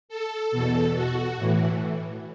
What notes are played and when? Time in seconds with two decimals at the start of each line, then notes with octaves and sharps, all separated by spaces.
0.09 A4
0.51 E2 B2
0.94 F#4
1.37 A2 E3